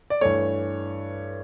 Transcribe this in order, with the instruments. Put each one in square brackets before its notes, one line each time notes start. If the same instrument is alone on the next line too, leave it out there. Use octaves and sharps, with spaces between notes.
[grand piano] D5
G2 E3 A3 C#5